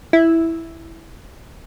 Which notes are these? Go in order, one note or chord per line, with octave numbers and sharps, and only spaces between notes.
E4